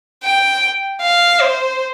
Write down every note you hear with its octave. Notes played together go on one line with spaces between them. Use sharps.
G5
F5
C5